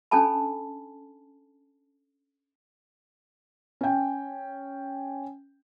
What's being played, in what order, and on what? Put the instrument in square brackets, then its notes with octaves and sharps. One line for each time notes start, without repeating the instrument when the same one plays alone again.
[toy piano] C#4 D4 A4 G#5 A5 B5
[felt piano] C#4 G5